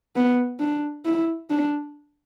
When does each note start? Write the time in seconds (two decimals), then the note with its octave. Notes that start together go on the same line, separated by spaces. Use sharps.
0.16 B3
0.60 D4
1.05 E4
1.50 D4